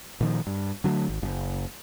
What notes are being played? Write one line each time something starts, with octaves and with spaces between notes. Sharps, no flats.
A#2 D#3 F3
G2
D3 F#3 G3 A3
G#1
F#1